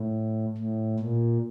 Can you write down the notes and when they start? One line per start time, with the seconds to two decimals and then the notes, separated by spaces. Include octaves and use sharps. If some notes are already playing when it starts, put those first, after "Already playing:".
Already playing: A2
0.58 A2
1.00 A#2